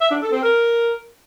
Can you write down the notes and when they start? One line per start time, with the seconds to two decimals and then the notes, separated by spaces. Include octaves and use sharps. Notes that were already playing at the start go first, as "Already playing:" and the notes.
0.01 E5
0.11 D4
0.22 A4
0.32 C4
0.42 A#4